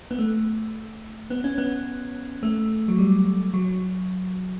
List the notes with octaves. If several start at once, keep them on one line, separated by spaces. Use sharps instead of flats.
B3
A3
B3
C#4
B3
A3
F#3
G3
F#3